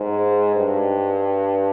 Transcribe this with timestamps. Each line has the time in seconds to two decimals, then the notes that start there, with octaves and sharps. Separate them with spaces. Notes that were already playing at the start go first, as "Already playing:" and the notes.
Already playing: G#2
0.56 G2